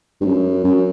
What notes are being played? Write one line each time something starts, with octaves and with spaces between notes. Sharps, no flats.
G2
F#2
F#2